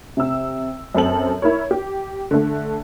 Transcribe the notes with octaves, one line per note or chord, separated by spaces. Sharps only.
C3 E6
F#2 C4 A4 F#7
E4 A#4 C#5
G4
D3 A3